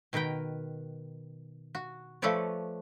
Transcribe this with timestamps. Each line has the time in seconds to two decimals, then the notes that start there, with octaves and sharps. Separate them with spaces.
0.13 B2 D#3 A#4 B4 G5
1.75 F#4
2.22 F3 A3 A4 B4 C#5 D5